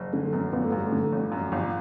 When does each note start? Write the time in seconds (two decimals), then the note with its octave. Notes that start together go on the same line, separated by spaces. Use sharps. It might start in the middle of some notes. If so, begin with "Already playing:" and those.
Already playing: F#1
0.13 D3 A3
0.26 A3
0.33 F#2 B3
0.53 G1 B3
0.64 A3
0.72 F#2 G3
0.87 A3
0.92 D3
1.12 G1
1.32 F#2
1.52 G1